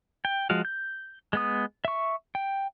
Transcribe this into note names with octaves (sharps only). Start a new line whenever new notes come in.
G5
F3 G#3 F#4 F5
G6
G#3 B3 D#6
E5 C#6
G5